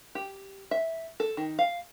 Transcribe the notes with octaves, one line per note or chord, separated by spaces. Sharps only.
G4
E5
A4
D#3
F5